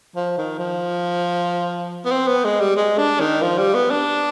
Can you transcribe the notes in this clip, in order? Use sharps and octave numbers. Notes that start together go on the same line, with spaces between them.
F3
D#3
F3
B3
C4
B3
G#3
G3
G#3
D4
D#3
F3
G3
B3
D4